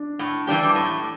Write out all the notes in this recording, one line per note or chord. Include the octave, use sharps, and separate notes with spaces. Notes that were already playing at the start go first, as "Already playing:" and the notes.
Already playing: D4
A2
E3 G3 D4 G4
A2